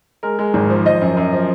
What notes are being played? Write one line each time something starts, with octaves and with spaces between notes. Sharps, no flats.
G#3 A#4
G#3
G#1
F3
F3 D#5
F#2
F#2
F3